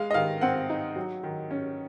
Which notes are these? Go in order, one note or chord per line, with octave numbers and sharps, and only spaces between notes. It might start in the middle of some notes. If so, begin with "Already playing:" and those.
Already playing: G#3 F5
D#5
D#3 F5
C4 F#5
D#4
F#3
D#3
C#4